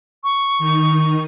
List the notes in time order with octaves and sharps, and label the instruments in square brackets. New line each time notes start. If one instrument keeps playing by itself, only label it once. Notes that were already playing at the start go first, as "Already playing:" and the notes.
[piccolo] C#6
[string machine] D#3 D#4